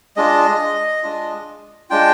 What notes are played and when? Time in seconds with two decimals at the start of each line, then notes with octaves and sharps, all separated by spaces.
0.17 G#3 D4 F4 D#5
1.03 G#3 D4 F4
1.90 G#3 D4 F4 G5